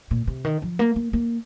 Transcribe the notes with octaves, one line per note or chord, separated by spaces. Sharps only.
A#2
C3
D#3
F3
A#3
A#3
A#3